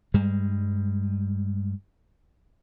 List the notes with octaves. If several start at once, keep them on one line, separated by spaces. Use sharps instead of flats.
G2 G3 G#3